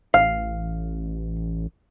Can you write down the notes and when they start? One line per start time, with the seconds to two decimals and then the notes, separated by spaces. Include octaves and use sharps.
0.14 A1 F5